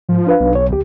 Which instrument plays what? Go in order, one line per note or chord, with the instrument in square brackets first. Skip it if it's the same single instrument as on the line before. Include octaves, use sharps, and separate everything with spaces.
[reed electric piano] G#2 [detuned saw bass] F3
[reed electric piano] D4 B4 F5
[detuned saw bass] B1
[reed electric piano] C#5
D2 G4